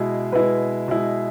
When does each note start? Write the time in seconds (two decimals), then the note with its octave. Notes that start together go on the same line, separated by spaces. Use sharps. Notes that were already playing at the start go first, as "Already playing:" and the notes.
Already playing: B2 G#3 E4
0.32 B2 G#3 E4 B4
0.88 B2 G#3 E4